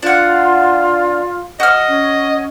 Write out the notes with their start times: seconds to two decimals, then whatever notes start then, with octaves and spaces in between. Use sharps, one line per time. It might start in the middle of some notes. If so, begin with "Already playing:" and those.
0.03 D4 F4 F#5
1.60 F#4 D#5 F6
1.88 C#4